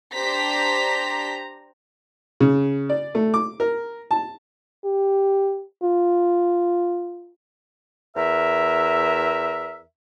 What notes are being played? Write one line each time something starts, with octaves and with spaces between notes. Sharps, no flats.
D4 G4 C5 A#5 B6
C#3
D5
A3
D6
A#4
A5
G4
F4
E2 A#4 E5